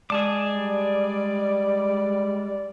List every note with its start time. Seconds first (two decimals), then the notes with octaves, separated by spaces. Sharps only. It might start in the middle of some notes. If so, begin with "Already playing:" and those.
0.10 G#3 G#4 D5 A5 D6
0.51 G3